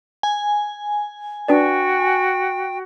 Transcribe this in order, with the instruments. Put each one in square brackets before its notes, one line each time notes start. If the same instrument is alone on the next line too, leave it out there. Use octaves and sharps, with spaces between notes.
[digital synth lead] G#5
[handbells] D4 B4 D5 [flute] F#4 [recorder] G5